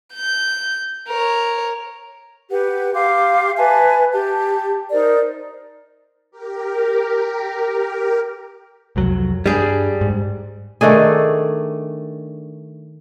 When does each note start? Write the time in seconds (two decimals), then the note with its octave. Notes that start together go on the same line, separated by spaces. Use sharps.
0.14 G6
1.08 A#4 C#5
2.50 G4 B4 F#5
2.94 G4 F5 C6 D6
3.58 B4 E5 G#5 A5
4.13 G4 A5
4.92 D#4 A#4 C5 D5
6.31 G4 A#4
8.96 C2 F2 F#3
9.46 G2 G3 G#4
10.01 G#2
10.81 D#3 A3 D4 G#4